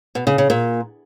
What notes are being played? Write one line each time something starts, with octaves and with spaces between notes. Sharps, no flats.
B2
C#3
C#3
A#2